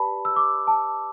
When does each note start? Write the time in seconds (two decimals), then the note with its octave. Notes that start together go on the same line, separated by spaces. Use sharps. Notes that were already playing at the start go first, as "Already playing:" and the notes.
Already playing: G4 B4 D5 A5 B5
0.25 E6
0.36 D6
0.67 A5